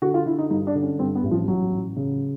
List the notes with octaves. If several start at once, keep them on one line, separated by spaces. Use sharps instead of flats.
D3 F#4
F4
D3 E4
D#4
G2 D#4
D4
D3
C#4
G2 C4
B3
A1
F3
A1 F#3
A1
C#3